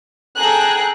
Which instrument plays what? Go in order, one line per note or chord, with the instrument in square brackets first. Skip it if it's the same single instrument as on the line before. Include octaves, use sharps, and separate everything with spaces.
[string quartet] G#4 G5 [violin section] A4 A#5 F#6